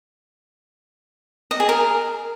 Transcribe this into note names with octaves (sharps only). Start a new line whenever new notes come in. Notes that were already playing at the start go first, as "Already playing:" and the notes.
D#5
G#4
A#4